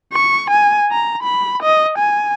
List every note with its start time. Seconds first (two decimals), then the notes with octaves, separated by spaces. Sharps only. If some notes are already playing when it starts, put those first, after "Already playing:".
0.13 C#6
0.50 G#5
0.92 A#5
1.23 B5
1.63 D#5
1.98 G#5